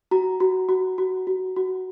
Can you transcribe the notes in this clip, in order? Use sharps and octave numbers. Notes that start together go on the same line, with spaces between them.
F#4 A#5
F#4
F#4
F#4
F#4
F#4